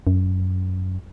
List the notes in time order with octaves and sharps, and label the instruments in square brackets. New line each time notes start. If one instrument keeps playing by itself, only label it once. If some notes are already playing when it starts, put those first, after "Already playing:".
[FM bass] F#2